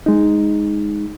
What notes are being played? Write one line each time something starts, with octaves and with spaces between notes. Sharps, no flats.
G#3 D#4